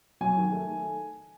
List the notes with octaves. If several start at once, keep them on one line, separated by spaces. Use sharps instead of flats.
F#3 G#5
D#3
A3